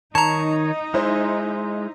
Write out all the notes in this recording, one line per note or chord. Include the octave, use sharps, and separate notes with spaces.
D#3 D#4 C#5 A5 A#5
G#3 E4 C5 D#5